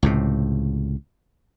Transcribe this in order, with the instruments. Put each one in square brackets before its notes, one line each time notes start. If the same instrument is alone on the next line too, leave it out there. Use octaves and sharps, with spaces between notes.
[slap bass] C#2 A2 C3